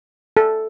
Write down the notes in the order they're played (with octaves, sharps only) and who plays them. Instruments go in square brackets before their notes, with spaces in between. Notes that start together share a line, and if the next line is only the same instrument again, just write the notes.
[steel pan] A4